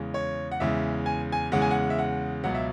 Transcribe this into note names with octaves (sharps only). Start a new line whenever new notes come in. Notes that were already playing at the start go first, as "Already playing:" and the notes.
Already playing: E2 C#3 G#3
C#5
F#5
E2 C#3 G#3 E5
G#5
G#5
E2 C#3 G#3 F#5
G#5
F#5
E5
F#5
C#2 B2 F#3 F#5
E5